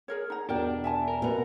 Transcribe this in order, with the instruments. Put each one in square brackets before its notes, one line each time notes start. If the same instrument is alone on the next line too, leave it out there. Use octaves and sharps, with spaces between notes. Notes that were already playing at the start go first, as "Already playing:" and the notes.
[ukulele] G#4 A#4 C#5
D#4 A#5
[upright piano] E2 B2 [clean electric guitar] D4 [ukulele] G4 A#4 G5
[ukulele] E5 G#5 A5
[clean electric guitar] A#4
[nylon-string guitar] B2 B3 [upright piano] C4 F7